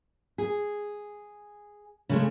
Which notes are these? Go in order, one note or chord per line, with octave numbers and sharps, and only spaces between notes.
G#4
C#3 G#3 A3